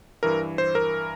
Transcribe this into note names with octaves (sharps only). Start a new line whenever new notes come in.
G2 E3 A#4
C5
A#4